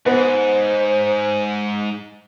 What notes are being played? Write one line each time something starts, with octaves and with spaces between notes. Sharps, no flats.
G#2 B3 C5